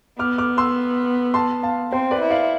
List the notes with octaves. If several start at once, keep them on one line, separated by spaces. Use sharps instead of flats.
B3 D6 F6
D6 F6
C6 E6
A5 C6
F5 A5
C4 C5
B4 D5
E4
D5 F5